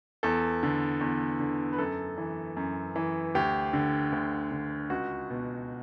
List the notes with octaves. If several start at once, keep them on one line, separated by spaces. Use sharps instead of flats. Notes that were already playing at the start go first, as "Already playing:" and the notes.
E2 A4
D3
E2
D3
B4
F#2 A4
E3
F#2
E3
D2 G4
D3
D2
D3
C#2 F#4
B2